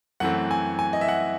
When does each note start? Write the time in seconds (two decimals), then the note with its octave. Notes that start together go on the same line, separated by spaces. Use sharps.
0.20 F#2 E3 A3 C4 F#5
0.51 G#5
0.79 G#5
0.93 D#5
1.01 E5
1.08 F#5